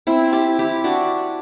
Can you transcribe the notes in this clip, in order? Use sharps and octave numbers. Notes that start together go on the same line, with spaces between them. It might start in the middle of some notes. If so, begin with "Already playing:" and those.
C4 E4
E4 G4
E4 G4
D4 F#4